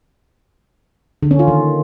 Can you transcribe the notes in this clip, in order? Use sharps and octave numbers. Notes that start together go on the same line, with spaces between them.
D3
C#4
F4
D#3